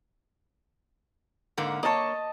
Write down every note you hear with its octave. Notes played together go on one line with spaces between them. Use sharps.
G#2 D3 A#3
A#3 C#5 D#5 A5